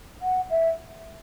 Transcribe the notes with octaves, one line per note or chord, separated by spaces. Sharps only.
F#5
E5